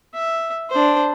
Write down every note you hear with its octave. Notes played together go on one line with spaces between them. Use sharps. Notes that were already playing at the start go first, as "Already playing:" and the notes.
E5
D4 C5